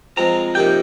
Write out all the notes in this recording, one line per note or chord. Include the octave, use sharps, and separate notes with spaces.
F3 G#3 C4 A#5
C3 F3 A#3 D#4 G4 G5